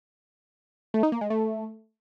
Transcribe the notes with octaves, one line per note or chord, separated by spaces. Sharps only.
A3
D#4
A#3
G#3
A3